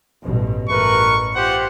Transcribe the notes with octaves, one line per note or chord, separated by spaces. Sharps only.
A1 G2 B2
A1 A3 A#4 B4 C#6
F4 G4 C5 F#5